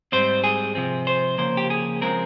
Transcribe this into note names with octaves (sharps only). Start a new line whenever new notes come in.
G#2 G3 C4 C5
G#4
C3 F3 C4
C5
C#3 F3 A#3 C5
G4
G#4
C#3 F3 G#3 C4 A#4